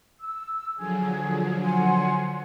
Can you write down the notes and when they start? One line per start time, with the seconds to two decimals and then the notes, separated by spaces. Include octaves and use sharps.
0.20 E6
0.78 D3 F3 F#3 G#4
1.63 F#5 G#5 C6